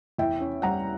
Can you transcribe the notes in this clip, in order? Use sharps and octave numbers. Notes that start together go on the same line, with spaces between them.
E2 E5 G5
C#4
G3 F#5 A#5